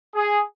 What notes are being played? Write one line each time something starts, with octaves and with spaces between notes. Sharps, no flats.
G#4